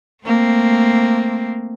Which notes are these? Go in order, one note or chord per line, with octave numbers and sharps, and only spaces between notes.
A3 A#3 C4